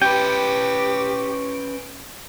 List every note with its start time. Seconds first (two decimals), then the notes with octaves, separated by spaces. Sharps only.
0.02 C#4 G4 B4 G5